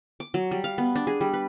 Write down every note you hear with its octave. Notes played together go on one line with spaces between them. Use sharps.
D6
F#3
G3
F5
B3
D4
G#4
G3
B4